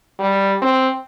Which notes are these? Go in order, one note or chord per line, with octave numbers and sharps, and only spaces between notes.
G3
C4